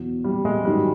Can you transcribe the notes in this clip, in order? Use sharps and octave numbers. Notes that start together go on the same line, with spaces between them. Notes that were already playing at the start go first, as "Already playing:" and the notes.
Already playing: E2 B2 F#3
G3
G#3
G#2 D#3 F#3 G3